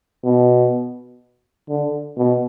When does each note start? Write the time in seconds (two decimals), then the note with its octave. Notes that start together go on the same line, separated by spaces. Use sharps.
0.24 B2
1.69 D3
2.17 B2